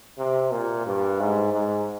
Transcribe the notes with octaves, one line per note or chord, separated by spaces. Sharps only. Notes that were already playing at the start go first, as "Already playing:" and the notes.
C3
A#2
G2
G#2
G#2